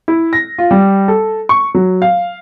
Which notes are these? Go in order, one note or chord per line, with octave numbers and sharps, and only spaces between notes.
E4
A#6
F4
G3
A4
C#6
F#3
F5